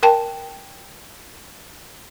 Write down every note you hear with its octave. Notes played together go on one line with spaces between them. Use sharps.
A#4 G5 A5